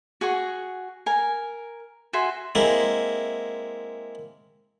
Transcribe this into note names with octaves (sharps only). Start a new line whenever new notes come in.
F#4 G#4 F#5 C#6
A#4 G#5
F#4 E5 G#5 C6
G#3 A#3 C4 E4